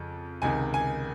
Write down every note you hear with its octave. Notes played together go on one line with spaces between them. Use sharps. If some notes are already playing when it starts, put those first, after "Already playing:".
Already playing: F2 C#3
C#2 C3 D#3 G#5
G#5